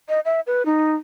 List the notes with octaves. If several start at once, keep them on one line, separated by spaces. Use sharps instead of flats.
D#5
E5
B4
D#4